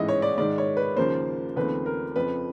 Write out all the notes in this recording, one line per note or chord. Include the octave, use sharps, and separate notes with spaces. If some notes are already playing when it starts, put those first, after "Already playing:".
Already playing: A1 G#2 E3 G#3 D#5 E5
C#5
D5
G#2 D#3 G#3 D5
C#5
B4
D#2 C#3 F3 A#3 C5
D#2 C#3 F3 A3 C4 B4
A#4
F2 C#3 F3 B4